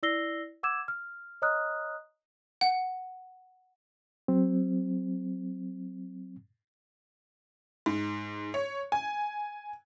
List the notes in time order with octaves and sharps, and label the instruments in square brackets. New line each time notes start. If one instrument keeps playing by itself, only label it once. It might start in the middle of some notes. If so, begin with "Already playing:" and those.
[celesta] E4 D5 E6 A#6 C7 G7
F#5 D6 E6 G#6 E7
F6
C#5 D#5 A#5 D#6 F6 F#6
[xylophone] F#5
[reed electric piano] F#3 C4
[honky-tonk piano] G#2
C#5
G#5